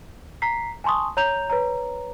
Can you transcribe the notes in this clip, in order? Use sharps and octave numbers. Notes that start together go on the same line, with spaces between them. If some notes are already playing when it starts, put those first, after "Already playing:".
A#5 B6 C7
G#5 A5 C6 C#6 D#6
C#5 A#5 G6 F7
B4 C#5 A#5